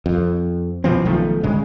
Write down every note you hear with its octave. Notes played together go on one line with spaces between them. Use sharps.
F2
B2 E3 F3 C4
B1 D#3 F3 A3
G1 G2 C#3 G#3